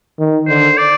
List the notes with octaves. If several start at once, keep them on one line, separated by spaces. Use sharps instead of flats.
D#3
D3 C5
D5